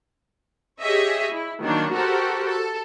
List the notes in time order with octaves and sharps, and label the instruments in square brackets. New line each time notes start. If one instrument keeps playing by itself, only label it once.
[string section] G4 G#4 C#5 D#5 E5
E4
D#3 F#3 A#3 D4
F#4 G4 A4 A#4 C5
A4